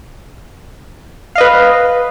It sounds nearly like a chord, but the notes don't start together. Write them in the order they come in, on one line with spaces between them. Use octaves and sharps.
F5 D#5 B4